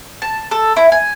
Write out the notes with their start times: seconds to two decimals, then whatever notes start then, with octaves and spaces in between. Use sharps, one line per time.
0.22 A5
0.51 A4
0.76 E4
0.92 G#5